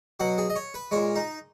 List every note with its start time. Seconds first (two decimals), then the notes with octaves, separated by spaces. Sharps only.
0.20 B2 F#3 F#5
0.38 G#4
0.50 D#5
0.56 C#5
0.74 B4
0.91 A#2 G#3 C#5
1.15 D#4